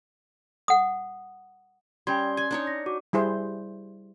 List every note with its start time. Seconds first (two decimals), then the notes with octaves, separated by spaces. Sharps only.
0.68 F#5 D#6
2.07 G3 C#4 G5 C6 G#6
2.37 G#5 G#6
2.51 D4 D#4 C#5
2.67 A#6
2.86 F#4 D6
3.13 G3 E4 G#4 C5